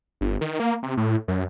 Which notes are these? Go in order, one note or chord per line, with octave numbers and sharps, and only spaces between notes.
G1
D#3
A#3
C3
A2
F#2